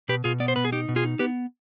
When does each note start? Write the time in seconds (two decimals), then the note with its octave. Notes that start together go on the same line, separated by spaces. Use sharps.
0.09 B2 G4 B4
0.24 B2 F4 G#4
0.40 B3 D5
0.48 C5
0.56 B2 B4
0.65 G#4
0.73 D#4 G4
0.89 B2
0.96 F4 G#4
1.04 D#4
1.19 B3 G4 B4